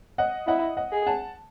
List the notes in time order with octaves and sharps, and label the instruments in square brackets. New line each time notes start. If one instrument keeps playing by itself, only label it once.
[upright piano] D#5 F#5
[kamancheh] E4 [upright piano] D#5 F#5
[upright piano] D#5 F#5
[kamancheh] G#4
[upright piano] F#5 A5